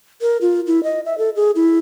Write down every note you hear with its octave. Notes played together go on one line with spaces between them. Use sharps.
A#4
F4
E4
D#5
E5
A4
G#4
E4